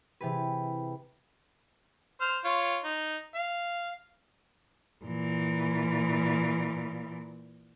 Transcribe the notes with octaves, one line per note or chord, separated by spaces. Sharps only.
C3 E3 G4 G#4 B4
C5 F6
F4 C#5
D#4
F5
A#2 E3